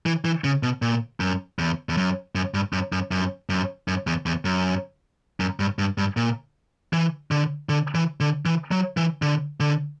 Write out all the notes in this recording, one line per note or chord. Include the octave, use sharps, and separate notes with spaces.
E3
E3
C#3
B2
A#2
F#2
E2
E2
F#2
F#2
G2
F#2
F#2
F#2
F#2
F#2
E2
E2
F#2
F#2
G2
G2
G2
A#2
E3
D3
D3
E3
D3
E3
F#3
E3
D3
D3